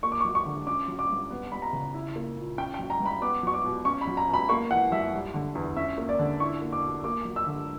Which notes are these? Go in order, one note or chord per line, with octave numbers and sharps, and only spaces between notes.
A#3 C#6
D6
C#6
F#3
C#6
D3
C#4 D6
F#3
D6
G2
B3
G3 B5
A#5
C#3
E4
A#3
A#2
C#4 G5
G5
F#3
A#5
G2
B5
B3 D6
F#3 C#6
D6
B2
C#4 C#6
B5
F#3
A#5
B2
B5
A#3 C#6
E3 F#5
F#2 E5
G3
D3
E2
C#4 E5
A#3
D5
D3
E4 C#6
A#3
D6
B2
A#3 D6
F#3
E6
D3